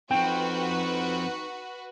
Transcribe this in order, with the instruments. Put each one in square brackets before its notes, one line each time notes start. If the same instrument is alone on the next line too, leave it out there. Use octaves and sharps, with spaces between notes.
[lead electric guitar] F3 C4 [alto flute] D#4 [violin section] F#4 B4 [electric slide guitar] G5